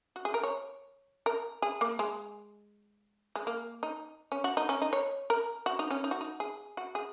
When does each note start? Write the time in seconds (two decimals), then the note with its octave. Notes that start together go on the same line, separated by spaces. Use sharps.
0.16 F#4
0.25 G#4
0.34 A#4
0.43 C#5
1.26 A#4
1.62 G#4
1.81 A#3
1.99 G#3
3.36 G#3
3.47 A#3
3.83 D#4
4.32 C#4
4.44 F#4
4.57 D#4
4.69 C#4
4.82 D#4
4.93 C#5
5.30 A#4
5.66 F#4
5.79 D#4
5.91 C#4
6.04 D#4
6.11 F#4
6.21 D#4
6.40 G#4
6.77 F#4
6.95 G#4